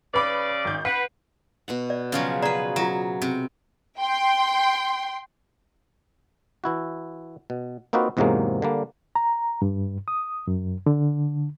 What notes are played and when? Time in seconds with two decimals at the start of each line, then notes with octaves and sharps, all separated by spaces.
0.14 C#3 B4 D5 B5 D6
0.65 G#1 G6
0.85 B4 F#5 C7
1.68 B2 F#4 F#5
1.90 D5
2.12 C#3 F3 F#3
2.42 G#4 B4 D5 A#5
2.76 F#3 F4 A#5
3.22 C3
3.99 G5 C6
6.64 E3 E4 F#4
7.50 B2
7.93 A#3 C4 D#4 F4 F#4 B4
8.17 E2 G#2 C3 F#3 G#3 A#3
8.62 D3 G3 A#3
9.15 A#5
9.62 G2
10.08 D#6
10.47 F#2
10.86 D3